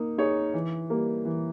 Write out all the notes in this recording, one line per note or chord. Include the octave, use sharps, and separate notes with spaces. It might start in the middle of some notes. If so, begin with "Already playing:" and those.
Already playing: A#3 D#4
D#4 G#4 C#5
E3
G3 A#3
E3